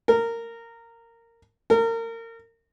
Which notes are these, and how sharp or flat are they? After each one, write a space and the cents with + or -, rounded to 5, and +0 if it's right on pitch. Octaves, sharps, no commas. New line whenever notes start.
A#4 -15
A#4 -30